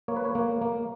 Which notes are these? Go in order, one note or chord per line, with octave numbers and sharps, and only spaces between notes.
A#3 C#5
B4
C#5
A#3
A#3